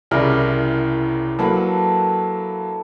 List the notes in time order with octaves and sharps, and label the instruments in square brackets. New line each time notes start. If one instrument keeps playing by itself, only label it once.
[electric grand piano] C2 C#3 [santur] G3 E4 A#4
[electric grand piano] F#3 A#3 [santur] A4 B4 F#5